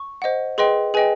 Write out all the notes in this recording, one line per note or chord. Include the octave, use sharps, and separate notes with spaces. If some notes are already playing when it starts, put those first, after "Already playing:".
Already playing: C#6
C5 D#5 F#5
G#4 B4 D#5 G5 C6
G#4 B4 D#5 G5 G#5